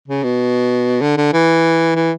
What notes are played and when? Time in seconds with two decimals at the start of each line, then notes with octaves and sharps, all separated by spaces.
0.08 C#3
0.24 B2
1.01 D3
1.17 D3
1.33 E3
1.95 E3